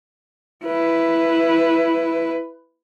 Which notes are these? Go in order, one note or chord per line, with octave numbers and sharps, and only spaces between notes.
E4 B4